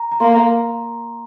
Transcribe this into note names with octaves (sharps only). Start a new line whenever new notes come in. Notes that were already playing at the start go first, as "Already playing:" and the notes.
Already playing: A#5
A#5
A#3 C6